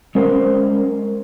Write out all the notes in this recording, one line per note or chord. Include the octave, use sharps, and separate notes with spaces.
G#3 C#4 A#4 C5